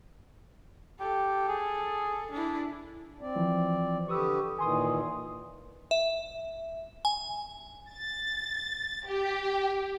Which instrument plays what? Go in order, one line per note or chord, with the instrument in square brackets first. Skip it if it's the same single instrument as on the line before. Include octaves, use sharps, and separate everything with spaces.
[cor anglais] G4 [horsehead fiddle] A4
[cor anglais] G#4
[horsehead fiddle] D4 E4
[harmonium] C4 D5
[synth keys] E3 F3
[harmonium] D3 G4 B4 [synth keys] C#6 D#6 E6
[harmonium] A#2 D#3 E3 [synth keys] G#5 C6 D#6
[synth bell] E5
G#5
[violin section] A6
G4